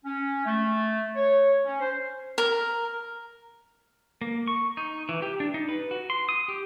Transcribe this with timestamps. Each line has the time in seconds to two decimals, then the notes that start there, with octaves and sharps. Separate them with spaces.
0.05 C#4
0.45 A3
1.16 C#5
1.65 C#4
1.80 C5
2.38 A#4
4.21 A#3
4.47 C#6
4.77 D#4
5.09 E3
5.22 G4
5.40 D4
5.54 D#4
5.69 B4
5.91 F#4
6.10 C6
6.29 D#6
6.48 G4